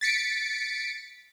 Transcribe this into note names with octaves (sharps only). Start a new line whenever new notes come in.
A6 B6 C#7 D7